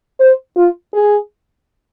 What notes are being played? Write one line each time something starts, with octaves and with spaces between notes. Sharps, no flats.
C5
F4
G#4